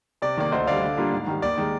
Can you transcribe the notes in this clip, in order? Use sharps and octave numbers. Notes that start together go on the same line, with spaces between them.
C3 D5
D#3 A#3 D5
D2 C5 D#5
D3 G3 D5 F5
D3
G3 A#3 D4 F4
G#2
D#3 G3
D#2 D5
D#3 G#3